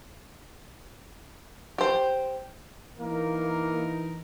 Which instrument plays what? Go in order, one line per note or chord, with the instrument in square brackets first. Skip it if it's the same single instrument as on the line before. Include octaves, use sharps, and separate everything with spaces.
[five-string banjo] G4 C5
[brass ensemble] E3 D#4 A#4 [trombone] A#3